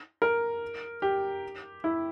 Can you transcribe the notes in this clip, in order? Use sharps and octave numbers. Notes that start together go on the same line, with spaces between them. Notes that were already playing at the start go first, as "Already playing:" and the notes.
A#4
G4
E4